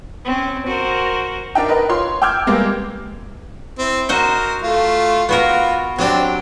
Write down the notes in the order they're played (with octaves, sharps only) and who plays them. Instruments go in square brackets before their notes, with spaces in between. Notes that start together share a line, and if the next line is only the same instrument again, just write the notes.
[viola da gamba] C4 C#4
F#4 A#4 C5
[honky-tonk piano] D4 D#4 A#4 E5 G5
A#4 B4 D#5
F4 C#5 C6
G5 D6 E6 F6 G6 G#6
G3 G#3 A#3 B3
[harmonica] C4 E4
[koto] F#4 C5 D#5 [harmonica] A#4
[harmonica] A3 F4
[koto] B3 F#4 A#4 [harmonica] F4
[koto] F#3 D4 [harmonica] C4 G4